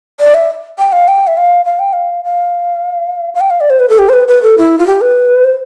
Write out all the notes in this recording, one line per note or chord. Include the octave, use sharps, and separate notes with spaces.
D5
E5
G5
F5
G5
E5
F5
F5
G5
F5
F5
F5
G5
F5
D5
C5
B4
A4
G4
C5
B4
B4
A4
E4
F4
G4
B4
C5